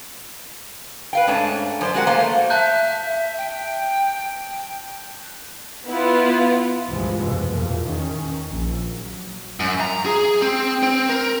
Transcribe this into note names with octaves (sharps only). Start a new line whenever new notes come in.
B4 F5 G5
G#2 A3 C#4 D4
F#2 C5 D5
G#3 F#4 G4 A#4 F#5
A3 A#3 C5 F5 A#5
E5 A5 F#6 G6
G5
B3 E4 F4
C#2 G2 A#2 E3 F3 G#3
F1 B2
E2 A#2
D#3 C#4
A#1
F#3
F#2
A#5
G#4
C4
C4
A#4